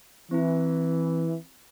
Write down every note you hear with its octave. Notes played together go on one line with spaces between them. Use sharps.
E3 C4 E4